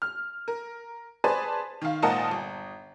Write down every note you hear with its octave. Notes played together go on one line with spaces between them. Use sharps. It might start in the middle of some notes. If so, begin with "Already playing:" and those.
F6
A#4
G#4 B4 C5 D5 G#5 A5
D#3 F5
G#1 A#2 A#4 D#5 F#5 A5
G1